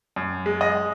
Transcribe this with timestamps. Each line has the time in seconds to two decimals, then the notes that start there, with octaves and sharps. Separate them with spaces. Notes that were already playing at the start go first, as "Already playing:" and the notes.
0.16 F#2
0.46 G#3
0.61 D#5